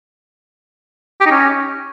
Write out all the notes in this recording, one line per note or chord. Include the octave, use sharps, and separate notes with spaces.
G4
D#4
C#4